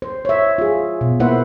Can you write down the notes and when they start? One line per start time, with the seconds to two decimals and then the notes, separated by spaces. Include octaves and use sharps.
0.02 C5
0.25 C#5 E5
0.58 F4 G#4
1.01 B2
1.20 A#3 E4 B4 C5 E5 F#5